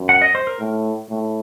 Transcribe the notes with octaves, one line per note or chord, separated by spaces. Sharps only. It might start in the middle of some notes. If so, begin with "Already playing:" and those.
Already playing: F#2
F#5
D#5
C5
A#4
A2
A2